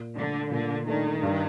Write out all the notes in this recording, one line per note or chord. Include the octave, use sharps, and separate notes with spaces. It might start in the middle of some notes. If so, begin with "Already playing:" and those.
Already playing: A#2
D3 A3 D4
A#2 D3
D#3 A3 D4
G2